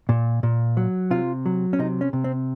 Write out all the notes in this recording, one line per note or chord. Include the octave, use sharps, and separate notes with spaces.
A#2
A#2
F#3
C3 F4
F#3
C#4
C3 D#4
C#4
C3
C4